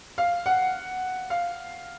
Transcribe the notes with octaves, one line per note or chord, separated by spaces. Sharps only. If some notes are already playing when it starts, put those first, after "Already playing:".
F5
F#5
F5